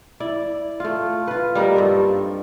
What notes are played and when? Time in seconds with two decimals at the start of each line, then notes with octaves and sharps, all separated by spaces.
0.20 E4 D5
0.80 A3 F4
1.27 F4 B4
1.55 G3 A#3 D#4 A#4
1.76 G2 C4 A4